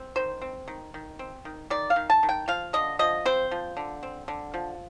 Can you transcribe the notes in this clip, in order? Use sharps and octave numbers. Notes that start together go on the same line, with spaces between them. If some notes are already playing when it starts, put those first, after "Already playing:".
Already playing: C4
D#3 C5
C4
D#3
D#3
C4
D#3
D#3 D5
F5
D#3
A5
D#3
G5
F3 F5
D3 D#5
F3 D#5
C4 C5
F3
D3
C4
D3
F3